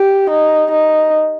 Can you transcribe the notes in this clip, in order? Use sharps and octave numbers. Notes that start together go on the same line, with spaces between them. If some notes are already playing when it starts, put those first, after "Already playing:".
Already playing: G4
D#4
D#4